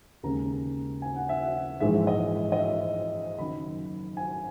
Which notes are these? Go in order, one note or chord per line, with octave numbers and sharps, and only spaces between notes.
D#2 C#3 G#3 C#4 A#5
G#5
F#5
E5
F#5
A#1 G#2 E3 G#3 E5
D#5
D#5
E5
F#1 F#2 D#3 B5
G#5